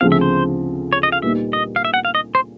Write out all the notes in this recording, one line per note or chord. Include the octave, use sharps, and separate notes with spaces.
D2 C#3 F3 G#3 C4 F5
E5
C5
C#5
D#5
F5
A#2 G3 B3 D#4 E5
D#5
F5
E5
F#5
F5
D#5
C5